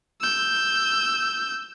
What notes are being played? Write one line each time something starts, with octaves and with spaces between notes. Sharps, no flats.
E6 G6